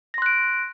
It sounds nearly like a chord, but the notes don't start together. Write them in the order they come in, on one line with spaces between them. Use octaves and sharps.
A#6 C6 F#6 D7